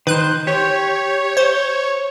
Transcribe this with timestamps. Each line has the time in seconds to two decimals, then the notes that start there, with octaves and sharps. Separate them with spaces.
0.07 D#3 B4 C5 F#6
0.47 G4 C#5
1.37 C5